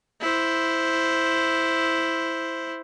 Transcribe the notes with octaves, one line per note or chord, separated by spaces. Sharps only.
E4 C5